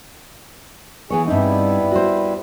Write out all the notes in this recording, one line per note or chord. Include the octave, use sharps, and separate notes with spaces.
E3 B3 G#4 C#5
G2 G3 B3 C4 D#4 E4
F#4 C5